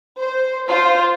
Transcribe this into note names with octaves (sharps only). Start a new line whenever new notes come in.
C5
F4 C5